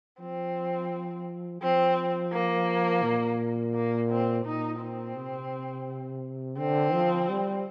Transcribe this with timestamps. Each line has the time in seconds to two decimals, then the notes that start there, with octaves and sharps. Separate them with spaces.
0.20 F3 C4
1.61 F3 C4
2.32 A#3
3.03 A#2
3.74 A#3
4.10 C4
4.45 A#2 D#4
4.80 C4
5.16 C3
6.58 D3 C4
6.93 F3
7.29 G3